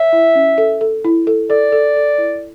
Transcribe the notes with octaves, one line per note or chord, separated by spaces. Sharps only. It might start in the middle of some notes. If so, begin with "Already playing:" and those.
Already playing: C#5 E5
E4
C#4
A4
A4
E4
A4
A4 D5
A4
A4
E4